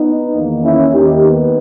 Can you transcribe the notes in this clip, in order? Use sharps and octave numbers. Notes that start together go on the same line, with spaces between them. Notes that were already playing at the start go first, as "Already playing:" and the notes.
Already playing: B3 D#4
E2 D#3 A#3
C#4 E4
D#2 D#3 A#3 D#4 G4
B3 D#4